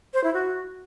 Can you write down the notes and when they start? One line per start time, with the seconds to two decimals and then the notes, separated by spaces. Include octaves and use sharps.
0.14 C5
0.24 E4
0.34 F#4